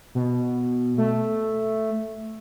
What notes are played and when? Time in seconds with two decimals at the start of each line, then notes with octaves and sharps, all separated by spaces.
0.15 B2
0.98 A3